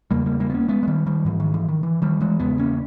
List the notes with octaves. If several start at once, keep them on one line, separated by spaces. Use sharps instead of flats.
E2 C#3 G3 A#3
G3 A#3
G3 A#3
B3
A#3 C#4
G#3 B3
G#3
D#3 G3
D#3 G3
G#2 E3
D#3
E3
D#3
E3
D#3 G3
E3 G#3
E2 C#3 G#3 B3
A#3 C#4